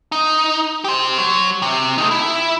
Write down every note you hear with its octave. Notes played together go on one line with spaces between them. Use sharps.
D#4
G4 C5
F#3
C3
A3 D#4
E4